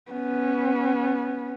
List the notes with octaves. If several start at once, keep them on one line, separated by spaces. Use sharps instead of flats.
B3 C#4